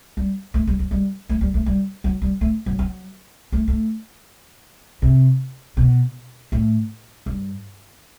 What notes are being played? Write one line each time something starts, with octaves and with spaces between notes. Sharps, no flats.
G3
A3
G3
F#3
G3
A3
G3
A3
G3
F#3
G3
A3
F#3
F#3
A3
A3
C3
B2
A2
G2